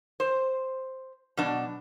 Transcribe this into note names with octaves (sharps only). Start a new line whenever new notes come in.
C5
B2 F#3 D4